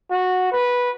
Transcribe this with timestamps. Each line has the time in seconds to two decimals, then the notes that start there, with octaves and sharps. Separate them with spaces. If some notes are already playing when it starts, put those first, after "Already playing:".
0.10 F#4
0.52 B4